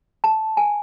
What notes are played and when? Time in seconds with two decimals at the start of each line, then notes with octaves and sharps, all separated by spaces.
0.24 A5
0.57 G#5